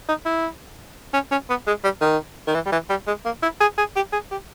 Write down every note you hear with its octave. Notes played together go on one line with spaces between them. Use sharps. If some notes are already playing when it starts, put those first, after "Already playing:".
D#4
E4
C#4
C#4
B3
G#3
G3
D#3
D#3
E3
G3
E3
G3
G#3
A#3
E4
G#4
G#4
G4
G#4
G4